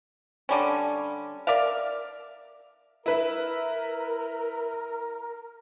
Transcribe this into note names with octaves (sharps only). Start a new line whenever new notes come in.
D3 G3 C#4
A#4 D5 E5 F5
E4 A#4 B4 E5